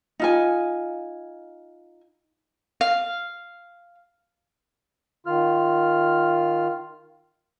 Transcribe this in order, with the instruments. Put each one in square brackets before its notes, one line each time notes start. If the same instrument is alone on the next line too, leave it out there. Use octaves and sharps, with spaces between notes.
[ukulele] D#4 F4 G#5
[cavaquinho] F5
[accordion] D#3 F4 F6